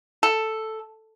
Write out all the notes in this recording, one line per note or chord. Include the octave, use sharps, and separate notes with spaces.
A4